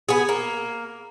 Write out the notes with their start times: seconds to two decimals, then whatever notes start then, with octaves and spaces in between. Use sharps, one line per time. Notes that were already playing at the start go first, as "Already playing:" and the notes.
0.09 B3 G#4
0.29 A#3